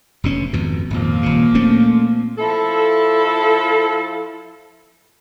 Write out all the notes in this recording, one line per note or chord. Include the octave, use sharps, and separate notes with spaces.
F1 B2 C#4
G#1 F2 B2
G#1 F2 A#2 F3 A#3
D#1 C#3
A3 C4 C#4
F3 E4 A4